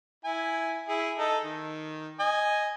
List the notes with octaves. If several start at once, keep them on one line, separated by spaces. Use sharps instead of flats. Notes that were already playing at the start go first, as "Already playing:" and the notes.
E4 G#5
E4 G#4
D#4 A4 D#5
D#3
D#5 G#5